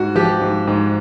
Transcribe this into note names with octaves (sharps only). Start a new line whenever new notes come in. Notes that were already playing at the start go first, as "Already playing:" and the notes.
Already playing: G#2 F#4
F3 G4
G#2
G#2